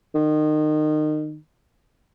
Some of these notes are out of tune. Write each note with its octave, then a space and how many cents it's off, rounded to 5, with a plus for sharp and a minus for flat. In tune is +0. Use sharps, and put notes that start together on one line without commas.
D#3 -30